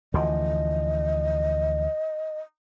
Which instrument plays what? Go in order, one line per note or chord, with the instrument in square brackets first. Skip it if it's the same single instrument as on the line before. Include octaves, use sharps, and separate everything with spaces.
[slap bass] D2 E3 F3 [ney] D#5